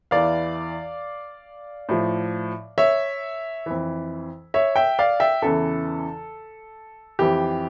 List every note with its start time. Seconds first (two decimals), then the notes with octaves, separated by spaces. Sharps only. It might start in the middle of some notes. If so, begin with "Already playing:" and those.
0.11 E2 E3 D5 F5
1.89 A2 F3
2.78 C#5 E5
3.66 F2 E3
4.54 C#5 E5
4.76 E5 G5
4.99 D5 F5
5.20 E5 G5
5.42 E2 C#3 E3 A4
7.19 F2 E3 G4